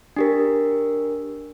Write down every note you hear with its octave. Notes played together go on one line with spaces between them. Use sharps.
D4 G4 A#4